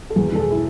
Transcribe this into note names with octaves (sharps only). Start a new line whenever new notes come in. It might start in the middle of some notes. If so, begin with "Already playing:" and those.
A4
E2 G#4
G#4
E1 A4
G#4
E4